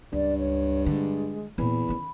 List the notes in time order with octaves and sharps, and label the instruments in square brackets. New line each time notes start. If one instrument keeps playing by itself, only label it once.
[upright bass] C#2 [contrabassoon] G2 [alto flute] D5
[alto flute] C#5
[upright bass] D3 [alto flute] G#3
[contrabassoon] E2 [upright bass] A#2 C4 [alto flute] B5
[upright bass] D#3 C#4